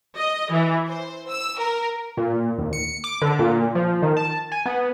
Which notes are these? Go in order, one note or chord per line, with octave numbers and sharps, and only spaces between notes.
D#5
E3
C5
E6
A#4
A#2
D#2
C#7
D6
D3
A#2
F3
D#3
A5
G#5
B3